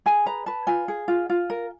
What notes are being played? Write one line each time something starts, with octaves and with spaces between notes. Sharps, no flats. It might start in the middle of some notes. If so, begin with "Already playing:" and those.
G#4 G#5
B4 A#5
B4 A5
F4 G#5
G#4
F4
F4
A#4